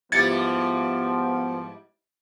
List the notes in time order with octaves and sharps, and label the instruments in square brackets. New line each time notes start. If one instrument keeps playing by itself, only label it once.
[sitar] G#2 G3 E4 [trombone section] F3 [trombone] B3 [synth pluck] G#6 A6 C#7